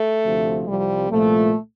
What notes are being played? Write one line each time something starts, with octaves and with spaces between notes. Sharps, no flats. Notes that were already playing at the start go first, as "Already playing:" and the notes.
Already playing: A3
D2 C3 F3
C2 C3 F3 G3
C2 A#2 F3 A3